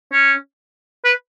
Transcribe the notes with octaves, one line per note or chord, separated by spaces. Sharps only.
C#4
B4